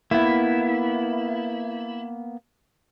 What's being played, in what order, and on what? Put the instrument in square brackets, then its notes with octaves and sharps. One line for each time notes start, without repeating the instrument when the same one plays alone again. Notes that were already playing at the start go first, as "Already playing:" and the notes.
[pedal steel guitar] A#3 B3 [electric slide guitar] E4